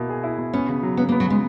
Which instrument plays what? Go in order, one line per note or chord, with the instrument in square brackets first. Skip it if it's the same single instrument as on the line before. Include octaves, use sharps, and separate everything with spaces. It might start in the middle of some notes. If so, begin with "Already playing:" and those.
Already playing: [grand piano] B2 A#3 E4
G#4
E4
B2
[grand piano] B3 [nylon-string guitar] C#4
[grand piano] C#3
F#3
[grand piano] C#3 [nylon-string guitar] B3
[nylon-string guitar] A#3
[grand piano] B3
[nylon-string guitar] F#3
[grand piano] C#3 [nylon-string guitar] G#3